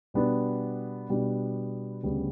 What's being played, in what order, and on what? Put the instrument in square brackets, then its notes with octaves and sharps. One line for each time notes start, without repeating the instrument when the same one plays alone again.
[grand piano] B2 G3 B3 D4
B2 G3 B3 D4
D2 C#3 G3 B3